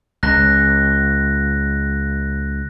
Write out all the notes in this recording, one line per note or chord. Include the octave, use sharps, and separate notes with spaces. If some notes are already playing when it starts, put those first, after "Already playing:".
C#2 F#6 A#6